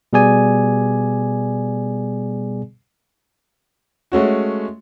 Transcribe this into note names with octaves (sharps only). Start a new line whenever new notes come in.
B2 G3 B3 G#4 D5 G#5
G#3 A3 C#4 F#4